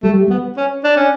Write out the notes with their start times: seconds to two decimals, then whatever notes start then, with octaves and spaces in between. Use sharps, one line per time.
0.03 G3 A3
0.30 B3
0.57 C#4
0.84 D4
0.97 C#4